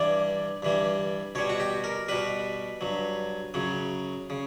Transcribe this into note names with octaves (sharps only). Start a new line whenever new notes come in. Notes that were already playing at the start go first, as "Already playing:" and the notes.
Already playing: G2 E3 G3 D5
G2 E3 G3
B2 G3 C#5
F#4
G4
A#4
B2 G3 B4
G2 F#3
F#2 C#3 F#3
C#3